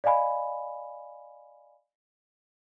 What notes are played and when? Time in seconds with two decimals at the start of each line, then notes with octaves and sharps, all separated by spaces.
0.04 D5 D#5 F5 G#5 B5